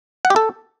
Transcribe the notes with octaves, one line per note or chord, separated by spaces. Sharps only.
F#5
G4
A4